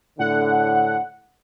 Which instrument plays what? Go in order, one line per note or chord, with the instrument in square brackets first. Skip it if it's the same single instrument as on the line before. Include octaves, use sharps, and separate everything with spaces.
[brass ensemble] A2 D3 [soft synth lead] F#5